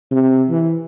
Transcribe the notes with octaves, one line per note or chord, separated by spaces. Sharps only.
C3
E3